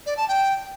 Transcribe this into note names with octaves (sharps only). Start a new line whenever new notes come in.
D5
A5
G5